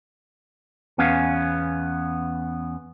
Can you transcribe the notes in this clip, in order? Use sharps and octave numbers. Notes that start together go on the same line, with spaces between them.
E2 B3 C#4 F5